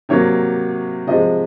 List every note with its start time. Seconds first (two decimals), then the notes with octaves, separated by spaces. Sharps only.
0.09 C3 F#3 A#3 C#5
1.07 C3 F3 G#3 D#5